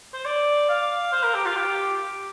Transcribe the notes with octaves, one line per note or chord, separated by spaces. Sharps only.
C5
D5
F5
C5
A#4
G4
F4
G4